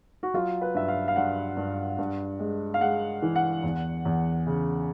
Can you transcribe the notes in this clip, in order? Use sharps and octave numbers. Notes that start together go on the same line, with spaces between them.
F#4
F#3 F4
B4
G2 E5
F5
F5
G2 F#5
G2
G2
G#3
F5
G#3 F#5
E3
F#5
E2
E2
C#3